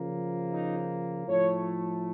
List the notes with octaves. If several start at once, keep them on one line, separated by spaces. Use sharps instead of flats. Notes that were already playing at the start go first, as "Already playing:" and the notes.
Already playing: C#3 F3 A#3
D#4
A2 F3 A3 C#5